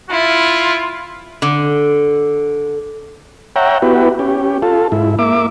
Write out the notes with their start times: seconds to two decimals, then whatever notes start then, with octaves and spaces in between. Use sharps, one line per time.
0.10 E4 F4
1.42 D3
3.56 C#5 E5 F#5 G5 A#5
3.82 B3 E4 F#4 G4 B4
4.19 C#4 G4
4.62 F4 A4
4.92 G#2 E4
5.19 A#3 E5 D6